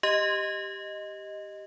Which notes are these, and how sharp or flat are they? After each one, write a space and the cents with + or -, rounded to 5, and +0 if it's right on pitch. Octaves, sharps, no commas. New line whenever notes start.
G4 +0 D#5 +0